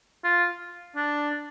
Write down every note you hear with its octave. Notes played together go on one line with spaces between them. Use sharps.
F4
D4